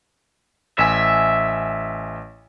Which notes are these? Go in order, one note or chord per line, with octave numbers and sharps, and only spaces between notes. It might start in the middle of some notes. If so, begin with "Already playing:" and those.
A1 E5 G#5